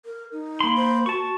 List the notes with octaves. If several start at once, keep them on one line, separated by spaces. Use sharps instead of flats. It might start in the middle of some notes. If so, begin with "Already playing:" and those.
A#4
D#4
A#3 B5 C6
C5
F#4 A5 C#6